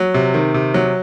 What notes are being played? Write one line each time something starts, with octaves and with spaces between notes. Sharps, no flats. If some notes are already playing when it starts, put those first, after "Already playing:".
Already playing: F#3
C3
D#3
C3
F#3